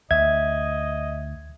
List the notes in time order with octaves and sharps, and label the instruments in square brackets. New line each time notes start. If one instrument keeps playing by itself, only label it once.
[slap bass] D2 [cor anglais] D#5 [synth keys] E5 [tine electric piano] G#6